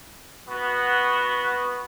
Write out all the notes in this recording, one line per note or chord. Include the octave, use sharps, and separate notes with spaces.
B3 F#4